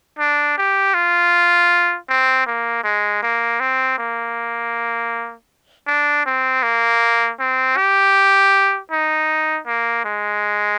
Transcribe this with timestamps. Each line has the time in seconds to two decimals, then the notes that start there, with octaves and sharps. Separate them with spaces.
0.19 D4
0.57 G4
0.94 F4
2.09 C4
2.46 A#3
2.84 G#3
3.22 A#3
3.60 C4
3.98 A#3
5.87 D4
6.26 C4
6.63 A#3
7.39 C4
7.77 G4
8.91 D#4
9.67 A#3
10.04 G#3